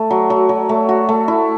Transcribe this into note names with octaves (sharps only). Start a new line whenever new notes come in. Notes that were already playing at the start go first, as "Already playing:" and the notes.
Already playing: A3
F#3
F#3
F#3
A3
F#4
A3
E4